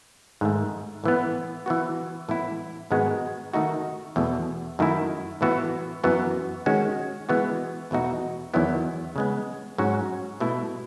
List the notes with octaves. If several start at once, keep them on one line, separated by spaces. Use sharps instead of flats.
G#2 D#3 A3
A2 E3 B3
E3 B3 F#4
A2 E3 B3 E4
G#2 D#3 G#3 B3 F#4
D#3 A3 D#4 F#4
E2 B2 A3
F#2 D#3 A3 E4
A2 E3 B3 F#4
F#2 E3 B3 F#4
D#3 G#3 C#4 F#4
E3 G#3 B3 F#4
E2 B2 A3 D#4 F#4
E2 D#3 F#3 B3 E4
C#3 G#3 B3
G#2 F#3 C#4 F#4
B2 A3 E4